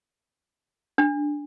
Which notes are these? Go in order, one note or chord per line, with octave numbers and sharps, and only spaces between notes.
D4